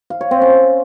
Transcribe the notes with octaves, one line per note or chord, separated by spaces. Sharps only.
F5
C#5
C4
C#4